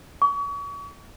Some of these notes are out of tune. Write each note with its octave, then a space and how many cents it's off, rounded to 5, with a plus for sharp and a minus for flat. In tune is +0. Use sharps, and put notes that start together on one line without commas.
C#6 +40